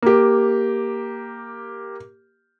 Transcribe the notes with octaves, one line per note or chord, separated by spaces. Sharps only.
A#3 G4